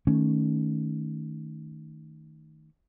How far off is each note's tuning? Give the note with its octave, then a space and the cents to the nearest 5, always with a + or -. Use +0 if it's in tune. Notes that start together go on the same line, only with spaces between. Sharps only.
D#3 +0 A3 +0 C#4 +0